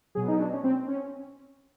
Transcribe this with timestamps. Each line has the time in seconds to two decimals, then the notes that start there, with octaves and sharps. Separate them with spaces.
0.15 B2 F#3 G#4
0.28 D#4
0.40 D4
0.53 C#4
0.64 C4
0.88 C#4